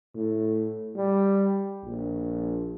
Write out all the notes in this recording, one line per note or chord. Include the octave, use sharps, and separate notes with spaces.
A2
G3
A#1